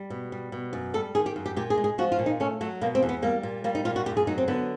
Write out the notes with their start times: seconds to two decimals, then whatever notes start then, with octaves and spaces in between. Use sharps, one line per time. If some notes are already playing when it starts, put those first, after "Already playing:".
Already playing: G3
0.10 B2
0.32 G3
0.52 B2
0.73 F#2
0.94 G3 A4
1.15 D#3 G#4
1.26 G4
1.36 F#2
1.46 G4
1.56 A#2 G4
1.70 G#4
1.77 G#3
1.84 G#4
1.98 F3 F#4
2.12 F4
2.19 A#2
2.26 D#4
2.40 A3 C#4
2.61 F#3 A3
2.81 B2 A#3
2.95 C4
3.03 E2
3.09 B3
3.22 G3 A#3
3.43 A#2
3.64 G3 A#3
3.75 D#4
3.85 A#2 F4
3.96 F#4
4.06 F#2 G4
4.17 G#4
4.27 F#3 D#4
4.38 C4
4.48 D3 B3